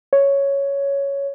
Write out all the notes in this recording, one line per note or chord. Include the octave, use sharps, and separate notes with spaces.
C#5